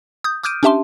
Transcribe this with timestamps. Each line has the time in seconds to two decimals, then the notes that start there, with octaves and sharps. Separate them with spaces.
0.24 D#6 G6
0.43 D6 D#6 F6 G6 D7 D#7
0.63 C#4 D4 G4 E5 A5 C6